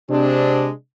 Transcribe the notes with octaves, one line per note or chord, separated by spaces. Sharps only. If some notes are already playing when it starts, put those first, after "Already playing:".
C3 G#3 C4 D4